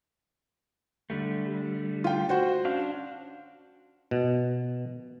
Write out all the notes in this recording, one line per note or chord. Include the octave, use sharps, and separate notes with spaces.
D3 G3 A3
F4 G5
F#4 C5 F#5
C#4 D4 F5
B2